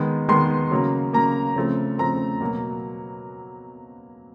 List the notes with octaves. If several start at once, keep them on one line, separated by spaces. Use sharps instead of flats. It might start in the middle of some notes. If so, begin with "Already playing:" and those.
Already playing: D#3 G#3 B3
D#3 G#3 B3 C6
C#3 F#3 A#3
C#3 F#3 A#3 A#5
C#3 F3 A3 C4
C#3 F3 A3 C4 A#5
B2 F#3 A#3